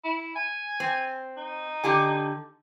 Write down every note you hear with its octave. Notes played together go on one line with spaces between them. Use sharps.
E4
G#5
C4
D#4
D3 G4 G#5